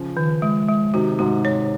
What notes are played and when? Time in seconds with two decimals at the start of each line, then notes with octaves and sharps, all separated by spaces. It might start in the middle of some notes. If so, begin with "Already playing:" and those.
Already playing: C#3 F3 C#4
0.17 D#3
0.42 G#3
0.69 G#3
0.94 C3 D#3 F#4
1.19 G#2 C3 F#4
1.45 C#5